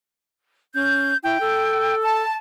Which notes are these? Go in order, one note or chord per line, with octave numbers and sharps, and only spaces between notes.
C#4 G6
E4 G5
A4
A5